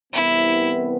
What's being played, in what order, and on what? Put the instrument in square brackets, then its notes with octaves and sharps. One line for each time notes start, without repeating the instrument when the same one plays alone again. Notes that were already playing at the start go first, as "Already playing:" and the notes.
[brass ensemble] C2 C3 E3 B3 [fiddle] E4